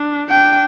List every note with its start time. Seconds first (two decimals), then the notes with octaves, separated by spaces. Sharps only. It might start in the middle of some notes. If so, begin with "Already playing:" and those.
Already playing: D4
0.30 D4 G5